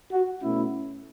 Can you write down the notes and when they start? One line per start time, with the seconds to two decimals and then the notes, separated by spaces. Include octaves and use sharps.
0.12 F#4
0.42 B2 A3 C#4 E4